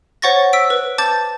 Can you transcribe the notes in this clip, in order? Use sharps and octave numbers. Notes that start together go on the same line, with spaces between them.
C5 C#5 F#5 C#6 A6 A#6
E6 B6 D7
B4
A5 D6 G6 A6